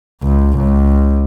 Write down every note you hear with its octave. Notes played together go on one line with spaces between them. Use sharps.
C#2
C#2